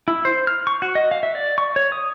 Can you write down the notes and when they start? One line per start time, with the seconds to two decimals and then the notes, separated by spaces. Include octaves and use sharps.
0.08 E4
0.25 C5
0.47 F6
0.67 C#6
0.82 F#4
0.95 D#5
1.11 F5
1.23 E5
1.35 D5
1.58 C#6
1.76 C#5
1.92 D#6